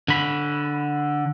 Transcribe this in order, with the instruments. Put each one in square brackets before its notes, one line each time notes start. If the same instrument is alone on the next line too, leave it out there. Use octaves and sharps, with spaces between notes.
[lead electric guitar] D3 B5